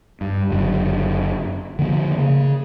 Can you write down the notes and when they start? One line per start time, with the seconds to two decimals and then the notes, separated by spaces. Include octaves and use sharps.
0.21 G2
0.50 F#1 F#2 D3
1.79 D3 F3 A#3
2.18 C#3